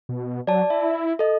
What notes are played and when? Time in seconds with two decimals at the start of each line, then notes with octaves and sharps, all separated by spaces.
0.09 B2
0.47 F#3 D5 A5
0.70 E4 E5
1.19 A4 D#5